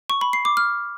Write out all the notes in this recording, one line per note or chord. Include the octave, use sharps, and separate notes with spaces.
C#6
B5
C7
D6
F6